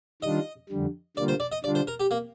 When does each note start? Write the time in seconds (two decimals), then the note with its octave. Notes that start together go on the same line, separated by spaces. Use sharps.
0.22 D#3 G3 D4 F4 D#5
0.70 F2 D3 G3
1.17 D3 G3 A#3 F4 D5
1.28 C5
1.40 D5
1.52 D#5
1.64 D3 G3 D4 F4 D5
1.75 C5
1.87 A#4
2.00 G4
2.11 A#3